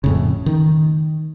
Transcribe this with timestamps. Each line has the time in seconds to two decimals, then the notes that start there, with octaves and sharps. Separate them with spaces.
0.04 F2 A2 C#3
0.46 D#3